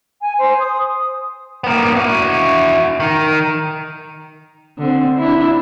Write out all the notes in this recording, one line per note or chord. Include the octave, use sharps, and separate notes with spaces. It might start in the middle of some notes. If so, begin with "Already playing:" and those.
G#5
C5
D#6
A#3 B3
E4 F#4
D#3
D3 C4
D4 E4